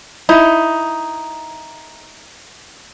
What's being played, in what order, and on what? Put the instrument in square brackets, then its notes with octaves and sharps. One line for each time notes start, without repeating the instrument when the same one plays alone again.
[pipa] D#4 [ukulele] E4